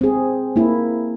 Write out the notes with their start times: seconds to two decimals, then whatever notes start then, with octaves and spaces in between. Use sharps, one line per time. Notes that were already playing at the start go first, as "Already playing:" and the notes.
0.01 C4 G#4
0.56 A#3 E4